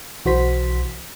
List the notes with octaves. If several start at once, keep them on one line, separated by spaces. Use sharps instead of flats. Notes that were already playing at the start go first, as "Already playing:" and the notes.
B1 E3 F#4 C5 B6